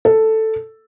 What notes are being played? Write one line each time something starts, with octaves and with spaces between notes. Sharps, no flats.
A4